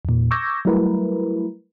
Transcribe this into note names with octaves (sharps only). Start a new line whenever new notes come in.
E2 A#2
C#6 D6 E6 G6 G#6 A#6
F#3 G3 A3 E4 A#4 B4